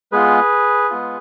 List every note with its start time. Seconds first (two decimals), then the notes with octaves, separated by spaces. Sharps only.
0.12 G#3 B3 F4 G#4 B4
0.90 G#3 B3 F4